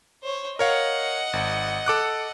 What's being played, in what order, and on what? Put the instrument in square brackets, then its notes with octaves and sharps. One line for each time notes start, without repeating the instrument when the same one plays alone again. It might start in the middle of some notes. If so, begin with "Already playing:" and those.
[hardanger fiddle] C5 C#5
[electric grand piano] A#4 C#5 F5 [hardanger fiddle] D#5 F#5
[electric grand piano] G#1
A4 D6 F#6